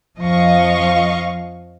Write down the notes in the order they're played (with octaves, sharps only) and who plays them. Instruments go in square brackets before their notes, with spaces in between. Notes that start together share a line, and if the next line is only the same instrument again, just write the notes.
[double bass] F2 F3 [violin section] D#5 F5 C#6